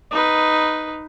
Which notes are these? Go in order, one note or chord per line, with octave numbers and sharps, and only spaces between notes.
D#4 B4